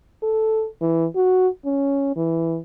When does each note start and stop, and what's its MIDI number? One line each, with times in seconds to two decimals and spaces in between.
0.22 0.66 69
0.81 1.06 52
1.16 1.48 66
1.65 2.14 61
2.16 2.58 52